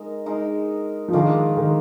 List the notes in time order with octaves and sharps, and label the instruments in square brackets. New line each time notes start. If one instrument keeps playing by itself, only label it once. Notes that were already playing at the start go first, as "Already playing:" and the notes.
Already playing: [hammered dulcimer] G#3 D#4 A#4
G#3 D#4 A#4
[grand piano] F3
[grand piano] D#3 [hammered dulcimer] G#3 D4 F4 A#4
[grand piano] D#3